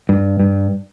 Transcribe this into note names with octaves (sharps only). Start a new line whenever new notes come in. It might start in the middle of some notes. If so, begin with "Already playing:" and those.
G2
G2